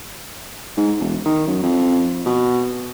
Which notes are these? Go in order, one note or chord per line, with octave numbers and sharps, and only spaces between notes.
G#2
E1
D#3
F#2
F2
B2